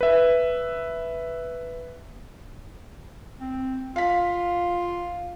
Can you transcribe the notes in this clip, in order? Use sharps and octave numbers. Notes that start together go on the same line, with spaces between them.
B4 E5
C4
F4 F5 B6